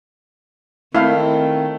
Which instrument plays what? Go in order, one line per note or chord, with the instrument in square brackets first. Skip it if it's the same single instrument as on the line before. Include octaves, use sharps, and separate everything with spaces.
[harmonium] D#3 [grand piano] A3 [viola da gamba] C4 [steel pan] E4 F5